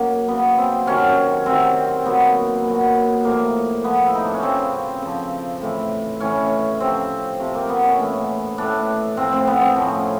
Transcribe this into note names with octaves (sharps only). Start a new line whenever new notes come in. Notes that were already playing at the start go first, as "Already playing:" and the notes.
Already playing: C#3 F#3 A#3
C#3 F#3 B3
C4
C3 D#3 F#3 C#4
C3 D#3 F#3 C4
A#2 F#3 B3
A#2 F#3
A2 F3 A#3
A2 F3 B3
E4
D#4
D4
C#4
C#3 F3 C4
C#3 F3
A2 E3
A2 E3 C#4
C3 F3 C4
C3 F3
A#3
B3
C#4
A2 E3
A2 E3 D4
A2 F3 C4
C4
B3
C4
A2 F3 C#4